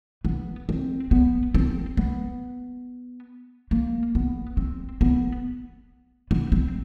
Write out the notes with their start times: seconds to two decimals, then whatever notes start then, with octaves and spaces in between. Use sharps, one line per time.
0.25 B3
0.69 C4
1.11 B3
1.55 C4
1.97 B3
3.71 A#3
4.15 B3
4.57 C4
5.01 B3
6.31 B3
6.52 C4